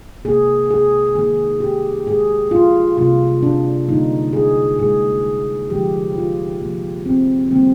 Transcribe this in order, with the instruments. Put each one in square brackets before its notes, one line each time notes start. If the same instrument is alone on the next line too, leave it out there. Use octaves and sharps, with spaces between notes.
[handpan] C3 D#3 A#3 G#4
G#4
D#3 A#3 G#4
G4
A#2 G#3 G#4
F4
C3 D#3 G3 A#3 F4
D4
D3 G3 A#3 D#4
G#4
A#2 G#3 G#4
D3 F3 G#3 G4
F4
C3 F3 A#3
C4
D#3 G3 A#3 C4